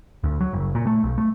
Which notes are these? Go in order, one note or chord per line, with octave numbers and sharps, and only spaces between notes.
D2
F#3
F#1
A#2
A3
B1
A3